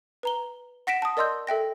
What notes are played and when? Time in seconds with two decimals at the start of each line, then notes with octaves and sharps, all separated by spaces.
0.23 B4 A#5 G7
0.87 F#5 A#6 B6 D7 E7
1.02 A5 D#6
1.17 A#4 D5 D#5 C6 E6 G6
1.47 A4 E5 G5 A#6